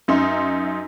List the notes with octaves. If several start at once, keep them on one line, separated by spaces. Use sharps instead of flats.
F#2 D#4 E5 C6